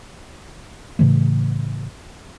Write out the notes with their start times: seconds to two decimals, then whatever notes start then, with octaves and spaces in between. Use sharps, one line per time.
0.99 A2 C#3 E3 A3